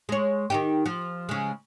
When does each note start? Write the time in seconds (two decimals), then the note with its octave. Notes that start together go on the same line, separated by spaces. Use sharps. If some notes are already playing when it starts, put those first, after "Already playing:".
0.09 G#3 C#5
0.50 D#3 D#4 G4
0.86 F3
1.29 C#3 G#3